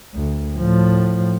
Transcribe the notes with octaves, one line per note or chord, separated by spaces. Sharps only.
D2
A2 F3